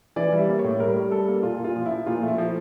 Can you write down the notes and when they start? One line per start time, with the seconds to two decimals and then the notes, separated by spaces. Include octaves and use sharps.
0.16 E3 D5
0.32 G3
0.38 E5
0.49 A#3
0.59 C#5
0.64 A2
0.80 G3 A#4
0.96 G3
1.11 G3 A4
1.28 A#3
1.43 A#2 F4
1.59 A#2
1.64 F4
1.76 F3
1.86 E4
1.91 F3
2.06 A#2 F4
2.22 A3
2.28 E4
2.38 F3